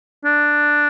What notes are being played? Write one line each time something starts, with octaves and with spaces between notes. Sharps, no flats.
D4